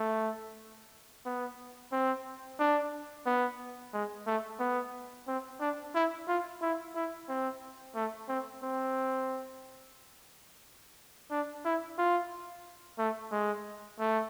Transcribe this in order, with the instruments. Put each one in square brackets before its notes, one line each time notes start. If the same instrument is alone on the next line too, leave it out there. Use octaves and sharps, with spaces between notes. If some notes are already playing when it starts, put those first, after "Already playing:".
Already playing: [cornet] A3
B3
C4
D4
B3
G#3
A3
B3
C4
D4
E4
F4
E4
E4
C4
A3
C4
C4
D4
E4
F4
A3
G#3
A3